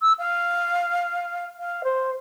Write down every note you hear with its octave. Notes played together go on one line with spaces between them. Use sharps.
E6
F5
F5
C5